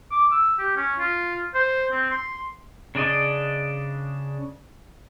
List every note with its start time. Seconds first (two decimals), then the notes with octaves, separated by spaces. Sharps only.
0.11 D6
0.31 E6
0.59 G4
0.77 C#4
0.99 F4
1.55 C5
1.92 C4
2.11 C6
2.95 C#3 D4 D5 D#5